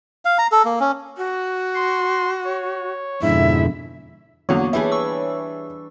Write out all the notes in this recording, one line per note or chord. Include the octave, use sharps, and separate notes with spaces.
F5
A#5
A4
A#3
C#4
F#4
C6
C#5
F2 G#2 B2 D3 E4 E5
E2 D3 F#3 A#3 B3 C#5
E3 G3 D4 E4 G#4
C#6 E6